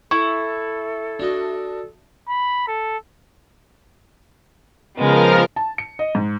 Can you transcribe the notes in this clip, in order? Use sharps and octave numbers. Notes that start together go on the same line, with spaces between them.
E4 A4 C#6
D4 F#4 D#5
B5
A4
C#3 F3 G#3 B3 A#4 F6
A5
C#7
D#5
G#2